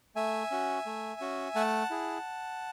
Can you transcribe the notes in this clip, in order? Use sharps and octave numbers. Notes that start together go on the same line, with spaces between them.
A3 E5 G#5
C#4 F#4
A3
C#4 F#4
A3 F#5 A5
E4 G#4